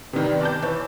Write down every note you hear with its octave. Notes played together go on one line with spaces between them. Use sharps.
C3 D#3 E3 G3 B3
D5 A5 G6
E3 B4 C#5